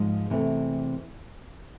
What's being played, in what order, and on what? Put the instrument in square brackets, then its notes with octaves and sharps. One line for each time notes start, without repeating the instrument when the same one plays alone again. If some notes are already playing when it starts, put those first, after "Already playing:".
Already playing: [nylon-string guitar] G#2 F3 G#3
E2 C3 E3 A3